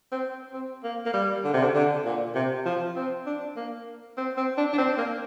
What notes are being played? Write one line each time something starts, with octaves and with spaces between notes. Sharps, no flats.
C4
C4
A#3
A#3
G3
D3
C3
D3
D3
A#2
C3
F3
C4
D4
A#3
C4
C4
D4
D4
C4
A#3